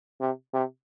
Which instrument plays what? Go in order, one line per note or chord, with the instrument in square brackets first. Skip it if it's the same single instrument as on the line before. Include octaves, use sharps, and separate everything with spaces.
[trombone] C3
C3